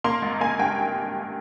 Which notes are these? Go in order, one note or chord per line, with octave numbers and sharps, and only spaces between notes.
A#3 C6
G#1
A#3 G#5
G2 G5